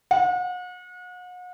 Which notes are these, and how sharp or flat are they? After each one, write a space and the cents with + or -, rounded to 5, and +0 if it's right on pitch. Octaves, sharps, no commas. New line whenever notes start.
F#5 -40